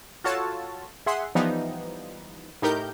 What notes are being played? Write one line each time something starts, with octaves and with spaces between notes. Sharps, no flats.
F4 F#4 A4 C#5 A5
G#4 E5 F#5 C6
E3 F3 G3 B3 D#4
A2 D#4 G4 A#4 G6